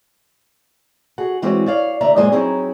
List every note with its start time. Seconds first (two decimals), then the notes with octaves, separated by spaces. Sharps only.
1.18 F#4 G#4 F#5
1.42 E3 G#3 C4 C#4 F#4
1.66 C#5 D5 F5
2.01 D2 D5 E5 A#5
2.16 F#2 A#2 G#3 C5 D#5 G#5
2.32 F#3 C4 C#4 D#4 E4 G#4